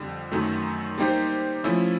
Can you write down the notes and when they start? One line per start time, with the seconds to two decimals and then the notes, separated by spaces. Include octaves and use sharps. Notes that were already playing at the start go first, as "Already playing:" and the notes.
Already playing: F2 D3 G3
0.31 F#2 D#3 F#3 A3
0.98 G3 A#3 D#4 G4 C5
1.64 F3 A3 C#4 E4 A4